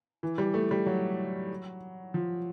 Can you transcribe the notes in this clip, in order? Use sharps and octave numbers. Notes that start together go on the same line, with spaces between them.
E3
G3
A3
G3
F#3
F3